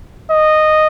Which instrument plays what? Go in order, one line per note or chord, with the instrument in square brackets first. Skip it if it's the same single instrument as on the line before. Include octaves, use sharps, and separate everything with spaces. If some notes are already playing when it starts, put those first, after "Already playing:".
[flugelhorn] D#5